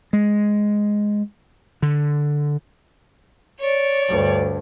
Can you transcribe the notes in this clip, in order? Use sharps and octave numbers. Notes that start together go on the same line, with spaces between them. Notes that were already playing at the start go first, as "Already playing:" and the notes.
G#3
D3
C#5 D5
D2 G2